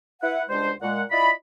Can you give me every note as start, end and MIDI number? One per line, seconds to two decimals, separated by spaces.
0.22 0.43 64
0.22 0.43 71
0.22 0.43 78
0.50 0.71 37
0.50 0.71 55
0.50 0.71 56
0.50 0.71 62
0.50 0.71 72
0.81 1.02 46
0.81 1.02 56
0.81 1.02 78
1.11 1.31 64
1.11 1.31 65
1.11 1.31 74
1.11 1.31 75
1.11 1.31 83